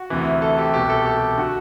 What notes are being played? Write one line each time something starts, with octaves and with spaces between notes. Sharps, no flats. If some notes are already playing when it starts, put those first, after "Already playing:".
Already playing: F#4
D2 C3 E3
A4
G4
C2 B2 G4
A4
G4
D3 F#4